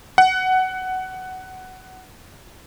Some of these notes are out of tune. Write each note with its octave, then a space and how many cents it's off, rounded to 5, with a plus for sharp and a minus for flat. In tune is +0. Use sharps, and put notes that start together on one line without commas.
F#5 +15